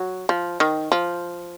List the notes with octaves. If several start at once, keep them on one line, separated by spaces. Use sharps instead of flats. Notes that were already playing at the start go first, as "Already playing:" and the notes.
Already playing: F#3
F3
D#3
F3